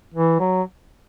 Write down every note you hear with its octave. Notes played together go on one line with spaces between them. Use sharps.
E3
F#3